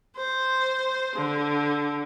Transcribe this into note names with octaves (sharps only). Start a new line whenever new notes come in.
C5
D3